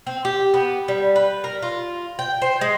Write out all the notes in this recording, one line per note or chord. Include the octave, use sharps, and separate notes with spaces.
C4
G4
B3
G3
B4
A#4
F4
G5
C5
G#3